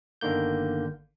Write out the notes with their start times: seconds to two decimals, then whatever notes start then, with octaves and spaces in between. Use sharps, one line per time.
0.21 G1 D3 D#3 A#3 G6